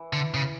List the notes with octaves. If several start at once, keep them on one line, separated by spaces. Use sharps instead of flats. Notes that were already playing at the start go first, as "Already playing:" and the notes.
Already playing: E3
D3
C#3